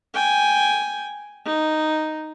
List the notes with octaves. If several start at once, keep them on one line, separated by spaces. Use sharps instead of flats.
G5 G#5
D#4